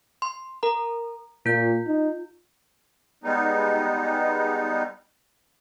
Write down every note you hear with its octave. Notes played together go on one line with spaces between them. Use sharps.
C6
A#4 A#5
A#2 F4 G6
D#4
G3 G#3 B3 D#4